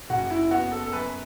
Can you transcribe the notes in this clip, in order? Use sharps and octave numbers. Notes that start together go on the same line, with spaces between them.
F#1 F#4
E4
B3 F#4
A4
A4
F#2 B4